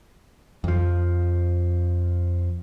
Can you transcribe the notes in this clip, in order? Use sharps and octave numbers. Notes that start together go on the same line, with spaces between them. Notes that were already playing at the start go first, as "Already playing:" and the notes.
F2 F3